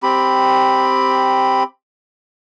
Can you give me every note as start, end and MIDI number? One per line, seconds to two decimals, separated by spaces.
0.03 1.63 60
0.03 1.63 67
0.03 1.63 83